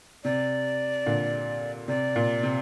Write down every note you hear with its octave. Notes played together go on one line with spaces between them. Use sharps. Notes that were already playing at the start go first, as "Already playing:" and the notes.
C3 D5
A#2 D3
C3 D5
A#2
C3